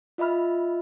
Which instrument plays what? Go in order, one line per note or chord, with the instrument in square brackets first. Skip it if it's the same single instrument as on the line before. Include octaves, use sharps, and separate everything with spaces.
[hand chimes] F4 D#5 E5 B5 F6